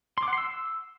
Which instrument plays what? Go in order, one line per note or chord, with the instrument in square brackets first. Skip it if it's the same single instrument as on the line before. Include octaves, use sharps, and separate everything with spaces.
[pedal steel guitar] C6
D6
F#5
C6
E6